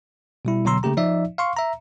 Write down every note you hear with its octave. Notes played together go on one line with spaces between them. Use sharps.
B2 G3 E4
B2 D3 F#3 A#5 C6 E6
C#3 A3 A#3 G4 A#5
F3 D#4 D5 E5
F5 C6 C#6
E5 A#5